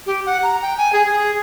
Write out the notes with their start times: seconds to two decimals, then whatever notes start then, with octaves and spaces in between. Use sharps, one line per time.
0.06 G4
0.26 F#5
0.43 A#5
0.62 G5
0.77 G#5
0.93 G#4
1.06 G#4